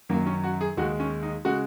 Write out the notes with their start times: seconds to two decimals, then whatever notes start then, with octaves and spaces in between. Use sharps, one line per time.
0.09 F#2 D#3 F#3 A#3
0.26 C#4
0.43 F#4
0.61 G#4
0.77 D#2 D#3 G#3 F#4
1.00 C#4
1.23 D#4
1.45 C#3 G#3 F#4